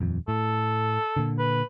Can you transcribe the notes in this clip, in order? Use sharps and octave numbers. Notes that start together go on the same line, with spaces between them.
D#1 F2
A2 A4
A#2 D3
B4